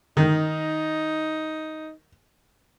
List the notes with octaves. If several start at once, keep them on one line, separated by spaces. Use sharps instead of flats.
D#3 D#4